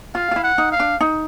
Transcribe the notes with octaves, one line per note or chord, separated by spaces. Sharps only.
F4 F5
F4
E4
F#5
D#4
F5
D4
D#4